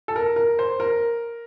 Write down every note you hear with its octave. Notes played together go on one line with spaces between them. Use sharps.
A4
A#4
A#4
C5
A#4